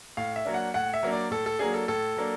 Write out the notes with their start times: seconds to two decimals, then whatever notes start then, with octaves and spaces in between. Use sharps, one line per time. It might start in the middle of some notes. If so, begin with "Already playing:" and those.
0.17 A2 F5
0.36 E5
0.45 F#3 A#3 D4
0.54 F#5
0.74 A2 F#5
0.94 E5
1.03 F#3 A#3 D4
1.13 D5
1.31 A2 A4
1.46 A4
1.59 F#3 A#3 D4 G#4
1.74 A4
1.88 A2 A4
2.17 F#3 A#3 D4